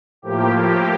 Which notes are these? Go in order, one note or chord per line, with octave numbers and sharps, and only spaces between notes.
A2 F3 A#3 G4
G4